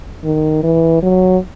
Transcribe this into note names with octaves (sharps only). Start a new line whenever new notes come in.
D#3
E3
F#3